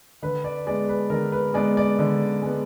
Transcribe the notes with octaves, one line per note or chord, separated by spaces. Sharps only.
D3 B4
D5
G#3 B3 D5
B4
D3 A#4
B4
G#3 B3 D5
D5
D3
G#3 B3